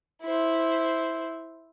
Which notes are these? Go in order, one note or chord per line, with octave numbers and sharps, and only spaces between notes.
E4 C5